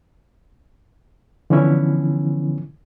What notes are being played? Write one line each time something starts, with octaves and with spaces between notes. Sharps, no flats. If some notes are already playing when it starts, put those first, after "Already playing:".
D3 E3 F3 B3 C#4 E4